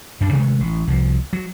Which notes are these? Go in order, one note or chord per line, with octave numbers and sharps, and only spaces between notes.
F#2 D4
C3 D#3 G#3 A3
A1
C2 F3
F#3